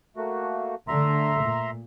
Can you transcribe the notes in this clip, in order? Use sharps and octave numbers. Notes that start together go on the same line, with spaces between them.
A3 A#3 F#4
D3 A3 E5 A#5 C6
A#2